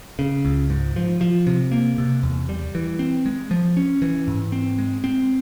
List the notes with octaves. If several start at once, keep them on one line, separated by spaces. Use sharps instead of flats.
C#3
C#2
G#2
F3
F3
C3
A#3
C3
E2
G3
E3
C4
G#3
F3
C#4
E3
G#2
C4
G#3
C4